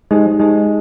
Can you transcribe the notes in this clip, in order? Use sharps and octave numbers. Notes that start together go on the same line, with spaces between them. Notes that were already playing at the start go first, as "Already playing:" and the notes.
G#3 D#4 G4 C5
G#3 D#4 G4 C5